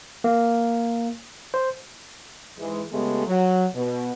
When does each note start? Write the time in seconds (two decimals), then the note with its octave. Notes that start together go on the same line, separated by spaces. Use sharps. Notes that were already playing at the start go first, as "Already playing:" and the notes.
0.24 A#3
1.54 C5
2.59 G#2 E3 G#3
2.92 C#3 G#3 A3 B3 G4
3.27 F#3
3.75 B2